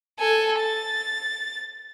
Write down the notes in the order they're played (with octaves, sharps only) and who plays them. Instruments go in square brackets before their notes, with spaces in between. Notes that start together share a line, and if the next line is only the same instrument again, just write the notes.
[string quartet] A4 G#5
A6